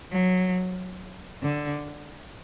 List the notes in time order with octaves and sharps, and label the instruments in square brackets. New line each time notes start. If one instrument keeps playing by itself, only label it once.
[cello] F#3
D3